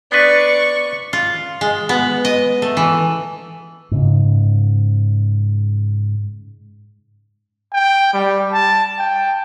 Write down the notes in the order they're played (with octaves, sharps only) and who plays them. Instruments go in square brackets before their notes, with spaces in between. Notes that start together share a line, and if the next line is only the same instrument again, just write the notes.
[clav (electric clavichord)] B3 D4 B4 [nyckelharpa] D5 [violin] C#6
[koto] F4
G#3
B3
D#5
A3
E3
[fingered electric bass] G#2 C#3
[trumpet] G5
G3
A5
G5